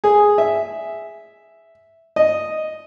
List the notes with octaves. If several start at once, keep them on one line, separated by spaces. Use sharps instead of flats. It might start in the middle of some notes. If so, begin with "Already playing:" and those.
G#4
E5
D#5